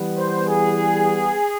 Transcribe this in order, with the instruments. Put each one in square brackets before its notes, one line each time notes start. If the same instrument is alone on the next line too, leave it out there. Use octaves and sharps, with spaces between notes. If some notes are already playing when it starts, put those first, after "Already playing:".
Already playing: [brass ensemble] E3 G3 B3
C5
G#4